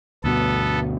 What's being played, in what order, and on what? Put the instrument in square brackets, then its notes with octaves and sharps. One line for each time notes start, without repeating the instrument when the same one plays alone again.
[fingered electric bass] D2 G2 B2 [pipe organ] B3 A4